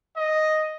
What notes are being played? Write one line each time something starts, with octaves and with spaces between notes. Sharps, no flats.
D#5